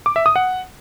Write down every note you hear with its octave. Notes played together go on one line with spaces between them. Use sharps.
D6
E5
D#6
F#5